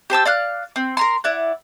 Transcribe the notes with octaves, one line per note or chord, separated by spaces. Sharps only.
G4 C5 A5 E6
D5 F5 F6 F#6
C4
A#4 A#5 C6
E4 D5 F#5